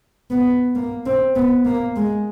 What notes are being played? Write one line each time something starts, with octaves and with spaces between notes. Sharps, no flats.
B3
A#3
C4
B3
A#3
G#3